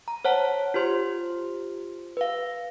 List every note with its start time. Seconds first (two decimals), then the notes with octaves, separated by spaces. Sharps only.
0.08 A#5
0.25 C5 C#5 F#5 A5
0.74 F4 G4 C5 C6
2.17 B4 F5